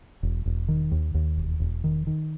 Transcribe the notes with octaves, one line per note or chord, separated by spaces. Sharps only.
E1
E1
D#3
D#2
D#2
E1
E1
D#3
D#3